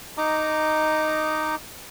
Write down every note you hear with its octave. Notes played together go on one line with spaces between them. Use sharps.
D#4 D#5 A#5 D6